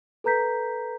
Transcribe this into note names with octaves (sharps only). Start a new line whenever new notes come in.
A4 B4 A#5 G6 B6